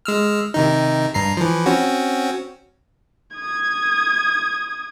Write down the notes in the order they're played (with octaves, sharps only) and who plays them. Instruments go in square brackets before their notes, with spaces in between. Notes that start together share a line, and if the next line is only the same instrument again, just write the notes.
[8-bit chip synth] G#3 E6 F6
C3 D#3 D#4
G2 A#5 C7
E3 F3
C4 C#4 F#4
[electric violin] D#6 G#6